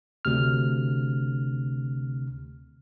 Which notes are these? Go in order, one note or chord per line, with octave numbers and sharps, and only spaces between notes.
D2 C3 F6